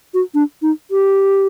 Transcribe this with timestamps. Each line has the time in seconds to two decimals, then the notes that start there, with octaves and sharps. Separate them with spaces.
0.14 F#4
0.34 D4
0.62 D#4
0.91 G4